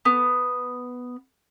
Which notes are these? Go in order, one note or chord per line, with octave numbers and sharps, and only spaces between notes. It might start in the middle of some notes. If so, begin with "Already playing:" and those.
B3